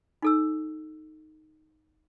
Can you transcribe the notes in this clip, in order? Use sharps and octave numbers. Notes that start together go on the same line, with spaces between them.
D#4 A4 E6